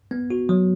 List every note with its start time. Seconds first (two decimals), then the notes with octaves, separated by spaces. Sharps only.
0.11 B3
0.30 F#4
0.49 F#3